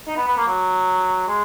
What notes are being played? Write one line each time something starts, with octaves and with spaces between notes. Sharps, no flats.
D#4
B3
B3
A#3
F#3
G#3